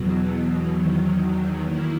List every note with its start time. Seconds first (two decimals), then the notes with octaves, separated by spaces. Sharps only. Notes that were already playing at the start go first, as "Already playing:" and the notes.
Already playing: E2 B2 F#3
0.70 E2 D#3 F#3
1.63 D#3 A#3 E4